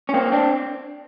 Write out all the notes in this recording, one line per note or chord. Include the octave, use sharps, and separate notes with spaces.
C#4
A#3 C4
C4 D4